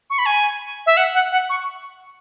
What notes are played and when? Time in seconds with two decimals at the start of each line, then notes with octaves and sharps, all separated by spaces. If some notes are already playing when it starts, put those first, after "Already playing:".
0.10 C#6
0.18 B5
0.26 G#5
0.86 E5
0.97 F#5
1.14 F#5
1.32 F#5
1.50 C#6